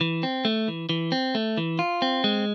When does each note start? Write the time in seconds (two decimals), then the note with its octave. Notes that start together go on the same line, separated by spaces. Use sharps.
0.01 E3
0.23 C4
0.45 A3
0.68 E3
0.89 E3
1.12 C4
1.35 A3
1.57 E3
1.79 F4
2.02 C4
2.24 G#3